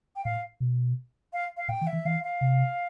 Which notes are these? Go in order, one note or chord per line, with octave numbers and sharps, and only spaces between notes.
G5
A2 F5
B2
F5
F5
A2 G5
E3
E5
E3
E3 F5
F5
C3